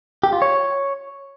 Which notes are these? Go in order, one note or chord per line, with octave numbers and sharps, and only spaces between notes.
G4
F4
C#5